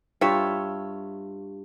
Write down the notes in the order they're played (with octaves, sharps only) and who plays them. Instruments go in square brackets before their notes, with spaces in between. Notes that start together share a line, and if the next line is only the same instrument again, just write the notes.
[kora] G2 F4 C#5 E5